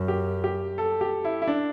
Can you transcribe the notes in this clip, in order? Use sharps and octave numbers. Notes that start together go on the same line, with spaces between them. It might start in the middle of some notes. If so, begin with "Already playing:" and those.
Already playing: F#2
G4
G4
A4
G4
E4
E4
D4